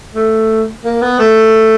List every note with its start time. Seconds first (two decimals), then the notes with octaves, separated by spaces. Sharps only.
0.15 A3
0.85 A#3
1.02 B3
1.19 A3